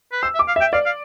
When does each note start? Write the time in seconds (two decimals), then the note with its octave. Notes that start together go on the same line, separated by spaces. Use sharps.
0.12 B4
0.22 C5 E6
0.35 E5
0.39 D6
0.48 F5
0.56 E5 G5
0.73 D5 F5
0.86 F5